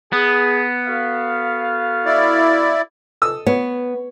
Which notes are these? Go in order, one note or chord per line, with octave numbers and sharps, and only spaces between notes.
B3 G#4
F#4 A4 F5
E4 D5
A4 D#6 E6
B3 C#5